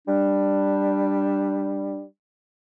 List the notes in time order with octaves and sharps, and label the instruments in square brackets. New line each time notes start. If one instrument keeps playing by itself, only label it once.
[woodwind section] G3 D4